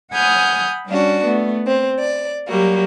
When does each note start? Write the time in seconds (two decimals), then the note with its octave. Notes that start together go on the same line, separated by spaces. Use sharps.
0.13 F#5 G#5 B5 D#6 F6 G6
0.87 G3 C#4 D4 F#4
1.24 A3 B3
1.66 C4
1.99 D5
2.48 F#3 G3 A#3 F#4